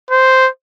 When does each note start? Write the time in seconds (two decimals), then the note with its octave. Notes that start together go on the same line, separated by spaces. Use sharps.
0.11 C5